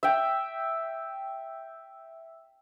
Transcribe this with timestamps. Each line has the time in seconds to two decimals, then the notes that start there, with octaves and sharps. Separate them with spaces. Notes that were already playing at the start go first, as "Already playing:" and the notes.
0.03 E5 G5